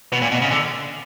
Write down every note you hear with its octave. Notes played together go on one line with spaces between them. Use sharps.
B2
A#2
B2
C#3
D3